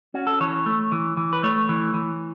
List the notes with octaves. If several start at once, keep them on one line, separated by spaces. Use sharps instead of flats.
C#4 F#4
A4
E3 C#5
A3
E3
E3
B4
A3 C#5
E3
E3